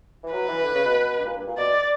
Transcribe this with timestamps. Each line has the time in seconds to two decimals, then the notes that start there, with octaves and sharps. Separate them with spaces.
0.23 E3
0.33 F#3 B4
0.48 E3
0.64 D3
0.74 C#3
0.85 B2
1.18 G2
1.26 A#2
1.37 G2
1.47 A#2
1.57 B2 D5